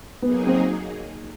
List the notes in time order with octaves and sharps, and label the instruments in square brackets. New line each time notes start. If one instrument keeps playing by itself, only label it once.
[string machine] F#3 A#3 D#4 G#4 [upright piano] B3
[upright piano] C4